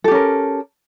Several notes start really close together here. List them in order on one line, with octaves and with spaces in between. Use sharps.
A4 G4 C#4 A#4